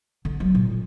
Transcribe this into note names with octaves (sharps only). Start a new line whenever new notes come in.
D3
F#3 G3
A#2